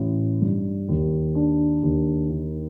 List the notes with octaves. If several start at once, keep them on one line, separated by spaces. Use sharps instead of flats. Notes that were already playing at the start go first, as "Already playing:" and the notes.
Already playing: A1
G2
D#2
D4
D#2
D#3